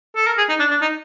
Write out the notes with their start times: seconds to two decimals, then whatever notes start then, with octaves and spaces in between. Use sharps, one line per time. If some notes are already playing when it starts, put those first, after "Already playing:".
0.16 A4
0.27 A#4
0.38 G#4
0.49 D#4
0.60 D4
0.70 D4
0.82 D#4